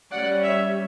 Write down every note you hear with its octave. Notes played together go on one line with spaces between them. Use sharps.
G3 C#4 D5 F#5
C#5 E5